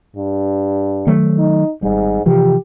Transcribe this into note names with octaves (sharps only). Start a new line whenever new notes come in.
G2
D#3 F#3 A3
D#4
G#1 G#2 G3
C3 E3 F3 G4